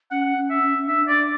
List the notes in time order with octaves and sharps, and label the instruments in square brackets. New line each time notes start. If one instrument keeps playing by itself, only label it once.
[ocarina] C#4 [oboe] F#5
[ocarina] C#4
[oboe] E5
[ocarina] C#4
C#4
[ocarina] D4 [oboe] E5
[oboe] D5